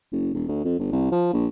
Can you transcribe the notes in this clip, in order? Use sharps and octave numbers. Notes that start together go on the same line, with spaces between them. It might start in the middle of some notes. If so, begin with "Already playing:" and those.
F#1
E1
D2
F2
G1
C2
F3
A#1